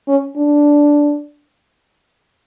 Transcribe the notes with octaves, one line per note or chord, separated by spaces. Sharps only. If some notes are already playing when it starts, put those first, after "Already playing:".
C#4
D4